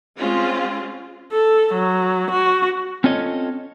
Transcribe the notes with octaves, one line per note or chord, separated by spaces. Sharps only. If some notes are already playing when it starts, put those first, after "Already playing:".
G#3 C4 C#4 F4
A4
F#3
F#4
C4 C#4 F4 A4 C#5 D#5